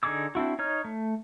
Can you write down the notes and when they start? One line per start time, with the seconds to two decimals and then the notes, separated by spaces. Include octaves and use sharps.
0.03 D3 D#4 G#4 D6 E6
0.35 C4 D4 E4 F#4
0.59 D#4 C#5 F6
0.85 A3